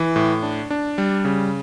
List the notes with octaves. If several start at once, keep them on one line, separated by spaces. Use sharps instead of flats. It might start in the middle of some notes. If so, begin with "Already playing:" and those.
Already playing: E3
A2
D4
D4
G3
C#3